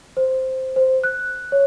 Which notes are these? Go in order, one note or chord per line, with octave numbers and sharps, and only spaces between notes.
C5
C5
F#6
C#5